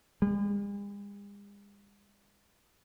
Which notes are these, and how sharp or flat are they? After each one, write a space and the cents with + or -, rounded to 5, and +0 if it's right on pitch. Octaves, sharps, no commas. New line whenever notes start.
G#3 -45